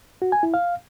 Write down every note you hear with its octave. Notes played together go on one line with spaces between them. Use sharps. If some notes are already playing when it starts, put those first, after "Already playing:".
F#4
G#5
E4
F5